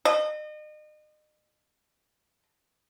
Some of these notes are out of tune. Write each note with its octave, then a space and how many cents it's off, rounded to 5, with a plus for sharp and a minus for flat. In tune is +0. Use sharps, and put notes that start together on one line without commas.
D#5 -35